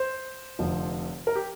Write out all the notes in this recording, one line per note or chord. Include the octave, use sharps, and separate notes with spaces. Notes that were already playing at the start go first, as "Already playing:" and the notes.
Already playing: C5
F1 F2 D3 F3
A#4
G4